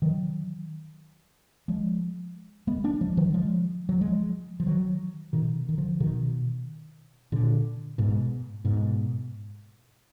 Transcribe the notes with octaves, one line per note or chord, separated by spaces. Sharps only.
D#3 F#3
F3 G#3
G#3 B3
A#3 D4
F3 G#3
D#3 F#3
F3 G#3
F#3
F3 G#3
F3
D#3 F#3
B2 D#3
D#3
D3 F3
B2 D#3
A#2 D3
G#2 B2
G#2 B2